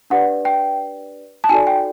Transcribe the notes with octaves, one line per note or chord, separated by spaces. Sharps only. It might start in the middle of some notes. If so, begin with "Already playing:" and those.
D4 G4 B4 D5 F#5
G5
A5
D#4 F#4 A4 D5 G#5
G5